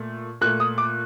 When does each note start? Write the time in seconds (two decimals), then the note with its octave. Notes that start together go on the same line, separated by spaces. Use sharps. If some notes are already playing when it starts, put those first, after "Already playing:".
Already playing: A#2 A3
0.41 A#2 F#6
0.45 A3
0.60 D#6
0.78 D6